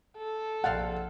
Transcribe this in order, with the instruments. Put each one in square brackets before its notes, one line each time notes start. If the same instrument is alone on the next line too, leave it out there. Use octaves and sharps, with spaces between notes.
[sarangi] A4
[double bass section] A#1 [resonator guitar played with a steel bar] C3 D5 F5 [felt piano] F#5